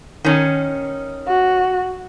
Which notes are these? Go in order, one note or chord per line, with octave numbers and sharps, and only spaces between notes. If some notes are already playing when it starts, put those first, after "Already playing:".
D#3 C#4
F#4